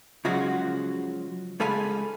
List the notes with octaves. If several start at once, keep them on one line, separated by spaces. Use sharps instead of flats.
C#3 F3 F#3 G#3 F#4
C#2 G#3 A4 F5 G#5 B5